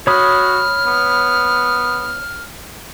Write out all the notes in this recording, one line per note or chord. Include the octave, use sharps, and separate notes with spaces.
F#4 C#5 B5 D#6 F6
B3